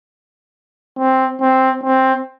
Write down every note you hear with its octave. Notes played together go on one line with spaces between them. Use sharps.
C4
C4
C4